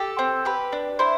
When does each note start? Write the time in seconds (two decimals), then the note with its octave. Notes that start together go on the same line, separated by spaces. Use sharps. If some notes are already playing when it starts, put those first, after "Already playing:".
Already playing: G4 A4
0.19 C4
0.45 G4 B4
0.72 D4
0.99 E4 C5